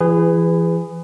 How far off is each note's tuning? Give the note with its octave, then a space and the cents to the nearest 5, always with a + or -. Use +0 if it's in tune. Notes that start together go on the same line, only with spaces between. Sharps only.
E3 +35 G#4 -10 B4 +25